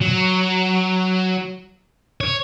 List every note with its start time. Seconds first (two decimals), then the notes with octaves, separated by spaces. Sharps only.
0.01 F#3
2.21 C#5